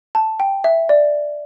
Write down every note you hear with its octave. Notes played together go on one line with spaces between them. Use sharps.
A5
G5
E5
D5